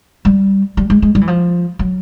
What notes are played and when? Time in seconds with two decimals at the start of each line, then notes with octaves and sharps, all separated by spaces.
0.25 G3
0.77 G3
0.90 G#3
1.02 G#3
1.15 G3
1.21 E3
1.27 F3
1.79 F#3